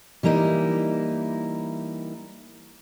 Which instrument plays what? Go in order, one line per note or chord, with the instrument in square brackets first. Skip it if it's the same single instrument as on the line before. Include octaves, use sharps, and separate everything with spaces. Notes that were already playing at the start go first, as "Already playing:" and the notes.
[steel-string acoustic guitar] E3 G3 A#3 D#4 E4